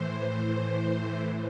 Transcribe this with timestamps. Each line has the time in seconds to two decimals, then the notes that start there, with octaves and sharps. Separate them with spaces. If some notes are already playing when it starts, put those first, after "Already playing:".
Already playing: A2 E3 C5